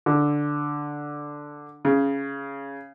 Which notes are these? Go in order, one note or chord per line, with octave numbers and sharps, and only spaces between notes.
D3
C#3